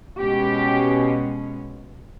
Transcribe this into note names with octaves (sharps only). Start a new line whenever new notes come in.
B2 G#3 C#4 G4